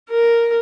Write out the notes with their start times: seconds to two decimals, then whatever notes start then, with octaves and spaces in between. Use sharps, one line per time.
0.10 A#4